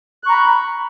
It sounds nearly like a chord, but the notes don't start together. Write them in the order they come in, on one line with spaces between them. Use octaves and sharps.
F#6 C#6 A#5 B5